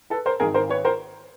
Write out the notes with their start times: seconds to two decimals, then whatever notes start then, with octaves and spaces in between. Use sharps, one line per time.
0.10 A4 B4
0.26 A#4 C5
0.40 G#1 G#2 D#3 G#4 A#4
0.54 A#4 C5
0.69 B4 C#5
0.85 A#4 C5